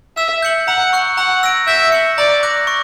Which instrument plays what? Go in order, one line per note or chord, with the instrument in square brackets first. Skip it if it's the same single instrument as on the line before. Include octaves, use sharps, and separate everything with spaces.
[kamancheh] E5 [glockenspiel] E6
[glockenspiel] G6 C#7 F#7
[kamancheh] F#5 [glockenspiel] A#5
[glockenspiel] C#6 F#6 C#7
[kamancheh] F#5 [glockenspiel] A#5
[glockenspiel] E6 A#6 D7
[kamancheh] E5 [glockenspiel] G6
[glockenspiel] C#7 F#7
[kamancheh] D5 [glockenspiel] A#5
[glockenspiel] D6 F#6 A#6
C#6